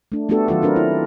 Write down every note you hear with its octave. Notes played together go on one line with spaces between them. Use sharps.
A3 D4
A3 B3 D4 F#4 G4 A4
D#3 F#3 F4 A4
C4 D4 A#4 B4
E4